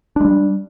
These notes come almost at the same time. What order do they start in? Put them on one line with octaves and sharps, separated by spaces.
D4 G#3 G3